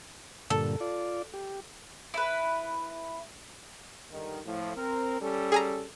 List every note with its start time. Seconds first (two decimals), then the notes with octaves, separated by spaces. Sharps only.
0.50 G2 A#2 D3 A4
0.80 F4 D5
1.34 G4
2.14 E4 B4
4.12 G2 D3 D#3
4.46 A2 F3
4.76 C4 A#4
5.21 G3 C#4 A4
5.52 G#4 G#5 A#5